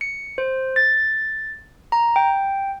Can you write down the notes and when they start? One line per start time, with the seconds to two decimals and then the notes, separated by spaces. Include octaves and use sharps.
0.01 C#7
0.38 C5
0.76 A6
1.92 A#5
2.16 G5